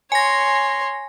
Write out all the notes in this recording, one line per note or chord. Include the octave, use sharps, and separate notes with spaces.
C#5 G#5 C6 A#6